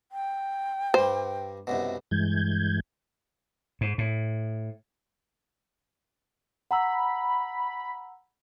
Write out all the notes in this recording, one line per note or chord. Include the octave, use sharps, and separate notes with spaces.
G5
G2 G3 C5
C2 F#2 B2
G2 E3 G#3 G6 G#6
G#2
A2
F#5 A#5 B5 E6